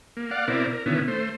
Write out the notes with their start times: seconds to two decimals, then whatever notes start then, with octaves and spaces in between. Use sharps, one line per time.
0.17 A#3
0.31 D5 F5 F#5
0.48 B2 C4 E4 A#4 D5
0.73 A#4
0.86 B2 D3 D#3 B3 C#4 E4
1.08 A3 C5